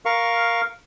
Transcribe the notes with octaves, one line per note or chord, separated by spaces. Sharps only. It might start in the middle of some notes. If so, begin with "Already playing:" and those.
A#4 F5 C#6